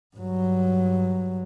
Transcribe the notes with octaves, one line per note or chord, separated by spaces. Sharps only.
G2 F#3